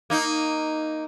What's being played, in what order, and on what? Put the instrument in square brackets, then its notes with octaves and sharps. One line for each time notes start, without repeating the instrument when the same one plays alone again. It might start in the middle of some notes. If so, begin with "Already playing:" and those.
[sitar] A#3 D#4